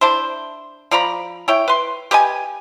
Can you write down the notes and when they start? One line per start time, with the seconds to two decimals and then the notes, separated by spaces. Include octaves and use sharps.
0.01 D4 E4 C5
0.91 F3 D5 A#5 B5
1.48 E4 C#5 G5
1.68 B4 C6
2.11 G4 B4 D#5 G#5